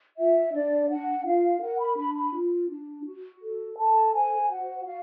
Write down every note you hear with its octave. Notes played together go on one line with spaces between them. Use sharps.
F4 E5
D4 D5
D4 F#5
F4 F5
A#4 F#5
B5
D4 B5
B5
F4
D4
F#4
A4
A4 A5
C5 G#5
F#4 F#5
F#4 F5